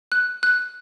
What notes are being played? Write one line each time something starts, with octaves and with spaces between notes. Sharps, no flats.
F#6
F#6